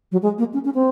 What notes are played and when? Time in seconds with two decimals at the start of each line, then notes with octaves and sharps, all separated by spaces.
0.12 F#3
0.22 G#3
0.38 A#3
0.53 C#4
0.65 C#4
0.74 C4